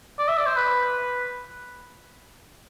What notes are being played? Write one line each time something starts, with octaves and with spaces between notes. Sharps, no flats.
D5
E5
D5
C5
B4